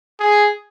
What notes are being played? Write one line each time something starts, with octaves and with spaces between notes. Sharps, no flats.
G#4